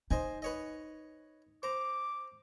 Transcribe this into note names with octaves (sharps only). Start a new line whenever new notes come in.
D#4 C5 D#5 G#5
B4 C#5 D#5
C5 A#5 D6